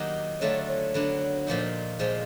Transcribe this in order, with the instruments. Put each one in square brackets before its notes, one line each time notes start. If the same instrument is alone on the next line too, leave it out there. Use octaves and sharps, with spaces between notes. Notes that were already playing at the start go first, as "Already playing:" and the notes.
Already playing: [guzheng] D#3 F#3 A#3 D#4 G4
[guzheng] D3 F#3 A3 D4 F4 [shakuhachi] C#5
[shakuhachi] C#5
[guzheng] D3 F#3 B3 D4
A#2 F3 A#3 D#4
[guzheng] A#2 F3 G#3 [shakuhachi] C5